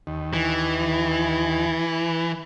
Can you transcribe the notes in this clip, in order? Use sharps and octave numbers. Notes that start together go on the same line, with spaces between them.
D#2
E3